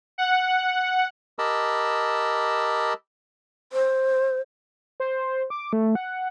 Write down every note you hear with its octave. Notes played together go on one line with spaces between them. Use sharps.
F#5
G4 A#4 D#5 A5 B5 E6
C5
C5
D6
A3
F#5